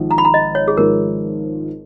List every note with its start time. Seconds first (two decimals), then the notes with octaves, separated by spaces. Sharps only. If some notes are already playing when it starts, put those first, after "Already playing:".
Already playing: G#1 G#2 F3
0.11 A#5
0.18 B5
0.25 A#5
0.34 D#5
0.55 C#5
0.68 G#4
0.77 G#1 G#2 F3 A#4